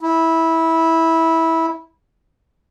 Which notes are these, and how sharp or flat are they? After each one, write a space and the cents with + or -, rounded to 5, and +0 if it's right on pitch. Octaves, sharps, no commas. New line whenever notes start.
E4 -15